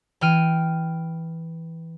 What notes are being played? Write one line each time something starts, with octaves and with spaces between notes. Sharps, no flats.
E3 G5 F6 D#7